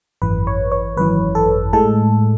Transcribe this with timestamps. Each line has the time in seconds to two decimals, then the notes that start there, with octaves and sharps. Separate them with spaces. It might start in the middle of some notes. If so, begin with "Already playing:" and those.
0.22 G#1 F#2 E3 B4
0.47 C#5
0.72 C#5
0.97 G#1 F#2 E3 B4
1.35 A4
1.73 A2 G#3 A4